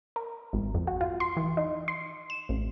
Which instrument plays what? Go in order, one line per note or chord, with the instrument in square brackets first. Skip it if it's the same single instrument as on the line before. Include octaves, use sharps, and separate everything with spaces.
[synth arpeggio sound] A#4
G#1
F2
F#4
F4
C6
E3
D#4
C6
E7
A1